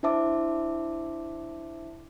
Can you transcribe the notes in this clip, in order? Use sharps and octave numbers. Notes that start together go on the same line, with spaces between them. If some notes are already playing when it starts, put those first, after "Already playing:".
D4 E4 C5 E5 A5 D6